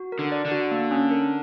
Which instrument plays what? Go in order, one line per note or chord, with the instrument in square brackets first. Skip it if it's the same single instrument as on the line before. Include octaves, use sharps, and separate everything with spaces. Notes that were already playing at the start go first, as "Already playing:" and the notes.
Already playing: [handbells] F#4
A#4
[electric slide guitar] D3
[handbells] D5
[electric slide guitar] D3
[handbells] F#4
A#3
C#4
A#4